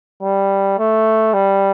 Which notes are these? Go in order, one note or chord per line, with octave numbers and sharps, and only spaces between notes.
G3
A3
G3